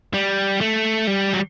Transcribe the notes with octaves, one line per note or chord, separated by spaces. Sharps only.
G3
A3
G3
F#3